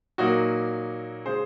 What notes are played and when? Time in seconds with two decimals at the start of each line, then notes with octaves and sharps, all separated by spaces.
0.18 A#2 F#3 A#3 D#4 F#4
1.26 C#3 G#3 G#4 C5